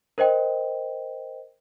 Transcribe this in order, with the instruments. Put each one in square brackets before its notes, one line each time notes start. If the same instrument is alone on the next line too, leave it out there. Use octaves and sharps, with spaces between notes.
[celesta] A#4 C5 D#5 G5